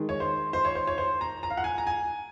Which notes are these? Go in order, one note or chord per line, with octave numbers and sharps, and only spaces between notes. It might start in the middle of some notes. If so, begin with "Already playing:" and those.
Already playing: D#3 G#3
C#5
C5
C5
C#5
C5
C#5
C5
A#5
A#5
F5
F#5
G#5
A#5
G#5